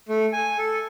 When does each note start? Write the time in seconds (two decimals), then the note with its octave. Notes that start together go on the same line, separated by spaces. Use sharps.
0.09 A3
0.33 G#5
0.58 A4